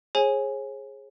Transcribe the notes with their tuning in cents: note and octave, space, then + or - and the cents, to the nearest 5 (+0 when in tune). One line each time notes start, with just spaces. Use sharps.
G#4 +0 C#5 -40 G#5 +0